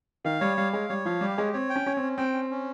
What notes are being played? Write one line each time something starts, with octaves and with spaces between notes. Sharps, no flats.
D#3 F5
G3 C#5
G3 F5
G#3 C#5
G3 C#5
F3 F5
G3 G4
G#3 C#5
C4 C#5
G5
C#4
C#4 C#5
C4
C#4
C4 G5
C#4
C#4